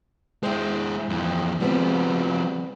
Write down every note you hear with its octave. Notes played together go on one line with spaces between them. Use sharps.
G#3 E4 C5 G5
F2 E3
F3 G3 G#3 B3 C4